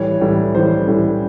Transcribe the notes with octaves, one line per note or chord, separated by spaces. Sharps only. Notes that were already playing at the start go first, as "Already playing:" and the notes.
Already playing: A2 E3 G3 C#5
A2 E3 G3
A2 E3 G3 C5
A2 E3 G3